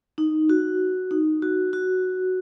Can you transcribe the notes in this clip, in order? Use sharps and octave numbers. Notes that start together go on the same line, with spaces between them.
D#4
F#4
D#4
F#4
F#4